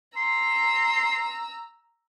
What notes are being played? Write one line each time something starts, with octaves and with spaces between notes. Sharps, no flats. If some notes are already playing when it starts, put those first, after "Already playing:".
A#5 C6 E6